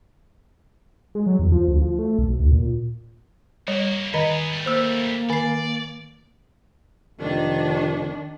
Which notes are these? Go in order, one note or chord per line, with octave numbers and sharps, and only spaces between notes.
G#3
F#3
E2
F3
D2
F3
A3
B1
D2
A#2
G3 A#3 F#4 C#5
D#3 B3 G#4 D#5 A#5
G3 A3
A#3 C5 E6
D#3 D5 G#5 C7
F1 D#3 D4